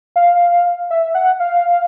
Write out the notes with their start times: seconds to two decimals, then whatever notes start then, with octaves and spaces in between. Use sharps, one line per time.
0.16 F5
0.90 E5
1.15 F#5
1.40 F5